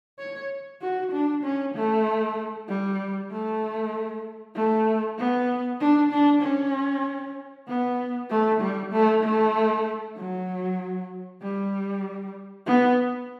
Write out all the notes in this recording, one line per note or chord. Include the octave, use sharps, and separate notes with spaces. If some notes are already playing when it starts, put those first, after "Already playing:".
C#5
F#4
D4
C#4
A3
G3
A3
A3
B3
D4
D4
C#4
B3
A3
G3
A3
A3
F#3
G3
B3